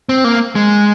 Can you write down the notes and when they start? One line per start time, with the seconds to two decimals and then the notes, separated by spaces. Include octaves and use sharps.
0.09 C4
0.24 A#3
0.55 G#3